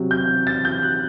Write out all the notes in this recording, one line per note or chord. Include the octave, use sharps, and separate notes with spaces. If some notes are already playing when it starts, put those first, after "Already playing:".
Already playing: C3 F#3
G6
A6
G6
F#6